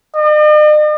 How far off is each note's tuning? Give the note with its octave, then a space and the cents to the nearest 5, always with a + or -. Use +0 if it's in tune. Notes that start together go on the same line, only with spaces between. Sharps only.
D#5 -45